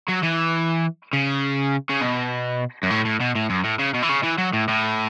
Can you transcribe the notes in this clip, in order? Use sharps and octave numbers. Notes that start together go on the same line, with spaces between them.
F#3
E3
C#3
C#3
B2
F#2
A2
A2
B2
A2
F#2
A2
C#3
B2
E3
C#3
E3
F#3
A2
A2